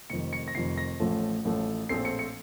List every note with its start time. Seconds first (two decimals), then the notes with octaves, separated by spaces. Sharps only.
0.10 F1 F2 D#3 C#7
0.33 C#7
0.48 A#6
0.55 F1 F2 D#3 C7
0.77 A#6
1.00 A1 A2 F3 A3
1.45 A1 A2 F3 A3
1.89 A#1 A2 A3 C4 C7
2.05 C#7
2.19 C#7